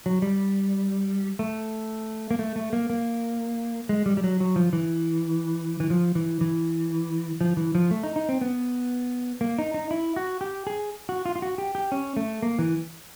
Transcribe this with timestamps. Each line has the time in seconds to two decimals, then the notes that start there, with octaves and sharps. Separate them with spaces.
0.06 F#3
0.22 G3
1.39 A3
2.31 A#3
2.39 A3
2.56 A3
2.73 A#3
2.90 A#3
3.89 G#3
4.06 G3
4.17 G3
4.24 F#3
4.40 F#3
4.56 F3
4.73 E3
5.80 E3
5.90 F3
6.15 E3
6.41 E3
7.41 F3
7.57 E3
7.75 F3
7.91 A3
8.03 D#4
8.16 D#4
8.29 C4
8.41 B3
9.41 A#3
9.58 D#4
9.74 D#4
9.91 E4
10.16 F#4
10.41 G4
10.67 G#4
11.09 F#4
11.26 F4
11.36 F4
11.42 F#4
11.58 G4
11.75 G4
11.92 C#4
12.17 A3
12.42 A#3
12.59 E3